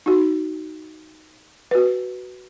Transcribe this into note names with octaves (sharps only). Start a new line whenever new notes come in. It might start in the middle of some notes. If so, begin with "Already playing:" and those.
D#4 F#4
F#4 B4